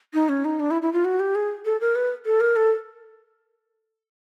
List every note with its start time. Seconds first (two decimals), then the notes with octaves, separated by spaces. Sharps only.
0.14 D#4
0.29 C#4
0.45 D#4
0.60 D4
0.71 E4
0.82 E4
0.93 F4
1.05 F#4
1.20 G4
1.35 G#4
1.65 A4
1.81 A#4
1.95 B4
2.26 A4
2.40 A#4
2.56 A4